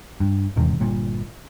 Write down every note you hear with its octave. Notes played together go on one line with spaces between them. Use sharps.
G2
D#1 E2 G#2 C3
G1 G2 A#2